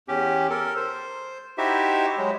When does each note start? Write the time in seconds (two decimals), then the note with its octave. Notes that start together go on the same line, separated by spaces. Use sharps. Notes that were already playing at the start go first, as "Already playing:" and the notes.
0.08 E2 C#4 G4
0.50 A4 A#4
0.76 C5
1.58 D#4 E4 F#4 G4 C5 E5
2.18 F#3 G#3